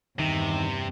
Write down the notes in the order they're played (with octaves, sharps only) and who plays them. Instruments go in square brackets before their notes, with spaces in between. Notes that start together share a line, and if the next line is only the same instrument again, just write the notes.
[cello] E2 G2 [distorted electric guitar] C3 [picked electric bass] D#3